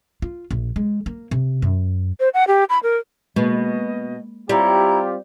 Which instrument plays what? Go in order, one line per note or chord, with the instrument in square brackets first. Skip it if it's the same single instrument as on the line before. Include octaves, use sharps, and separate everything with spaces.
[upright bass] F4
A#1
G#3
A#3
C3
F#2
[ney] C5
F#5
G4
B5
A#4
[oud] B2 [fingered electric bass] G#3 A#3 [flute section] D#5
[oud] G3 [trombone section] C4 F4 G4 [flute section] E4 C#5 A#5